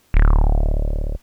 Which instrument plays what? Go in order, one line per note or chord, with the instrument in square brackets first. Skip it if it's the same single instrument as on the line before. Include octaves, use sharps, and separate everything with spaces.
[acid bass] D1